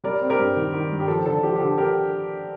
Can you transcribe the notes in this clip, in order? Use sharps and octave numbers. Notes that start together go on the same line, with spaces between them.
G3 A#4 D5
C4
G4 A#4
G2
D#3
D#3
G2
G4
F3 A4
D3 A4
F3 G4
G4
D3 A4
G4 A#4